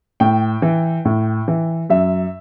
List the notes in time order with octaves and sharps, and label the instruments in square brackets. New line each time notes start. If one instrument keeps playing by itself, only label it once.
[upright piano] A2 G5
E3
A2
E3
F#2 E5